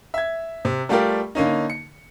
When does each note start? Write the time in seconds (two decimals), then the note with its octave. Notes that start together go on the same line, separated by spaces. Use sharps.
0.14 E5 G#6
0.65 C3
0.89 G3 A3 F4 G4 A#4 D5
1.35 D3 A#3 C#4 D#4
1.70 C#7